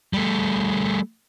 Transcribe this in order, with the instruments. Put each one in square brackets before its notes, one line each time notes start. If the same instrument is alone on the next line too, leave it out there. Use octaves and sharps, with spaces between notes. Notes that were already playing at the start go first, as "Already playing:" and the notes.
[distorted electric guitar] G3 A3